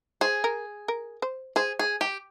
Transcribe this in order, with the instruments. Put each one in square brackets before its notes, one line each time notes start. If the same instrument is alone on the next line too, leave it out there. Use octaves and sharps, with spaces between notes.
[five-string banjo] G#4 [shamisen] C5
[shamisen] A#4
A#4
C5
[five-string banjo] G#4 [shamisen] C5
[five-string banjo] G#4
G4